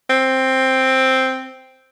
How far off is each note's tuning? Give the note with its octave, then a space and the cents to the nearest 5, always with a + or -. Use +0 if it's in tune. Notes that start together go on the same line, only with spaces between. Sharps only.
C4 +5